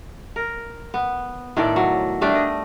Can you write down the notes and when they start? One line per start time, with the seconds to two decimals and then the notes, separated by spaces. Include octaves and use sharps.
0.36 A#4
0.94 B3
1.57 A2 D#3 A4 D5
1.76 F#3
2.21 G3 A3 D4 E5
2.35 D#5